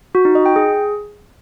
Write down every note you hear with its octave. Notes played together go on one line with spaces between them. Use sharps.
F#4
D#4
D#5
G5
G#4